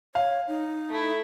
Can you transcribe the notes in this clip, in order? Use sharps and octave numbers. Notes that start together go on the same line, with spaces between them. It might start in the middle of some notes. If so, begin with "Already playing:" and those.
C#5 F5
D#4
A3 E4